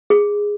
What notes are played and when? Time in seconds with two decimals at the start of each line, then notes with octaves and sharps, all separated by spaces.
0.10 G#4